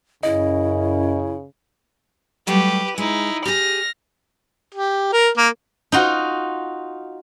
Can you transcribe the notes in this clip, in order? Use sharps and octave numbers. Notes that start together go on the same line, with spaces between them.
F#2 C#3 E4 D#5
F#3 G3 A3 G4 B4
G#3 D#4 E4
G4 G#4 F6 A#6
G4
A#4
A#3
D#4 F4 F#4